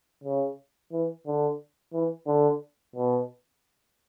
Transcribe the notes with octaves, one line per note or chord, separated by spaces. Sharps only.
C#3
E3
D3
E3
D3
B2